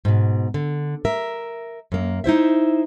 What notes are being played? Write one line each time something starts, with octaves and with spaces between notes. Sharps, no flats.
G#2 B2
D3
A#4 E5
F#2 A#3
D#4 E4 C5 E5